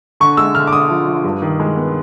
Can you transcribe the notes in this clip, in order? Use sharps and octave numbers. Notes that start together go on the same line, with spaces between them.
D3 C#6
G#3 E6
D3 F6
D6
D3 D#6
F3
F3
G2
D#3
G#3
B3